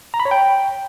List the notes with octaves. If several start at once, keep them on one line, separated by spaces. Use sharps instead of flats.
A#5
B5
C#5
G5